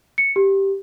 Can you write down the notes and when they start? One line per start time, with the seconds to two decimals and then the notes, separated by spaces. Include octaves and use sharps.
0.18 C#7
0.36 G4